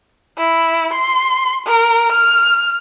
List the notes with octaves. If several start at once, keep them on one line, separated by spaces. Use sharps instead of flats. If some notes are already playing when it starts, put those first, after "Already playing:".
E4
C6
A#4
F6